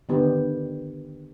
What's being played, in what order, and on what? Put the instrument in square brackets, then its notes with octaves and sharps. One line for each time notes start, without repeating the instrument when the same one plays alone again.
[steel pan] D3 D#3 B3 G4